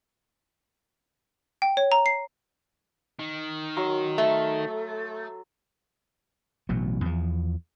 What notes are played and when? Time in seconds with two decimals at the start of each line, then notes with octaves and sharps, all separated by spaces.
1.62 G5
1.77 C#5
1.92 A#5
2.06 C7
3.19 D#3
3.77 F#3 C6 C#6
4.18 A3
6.69 A1 B2 F#3
7.05 E2 F3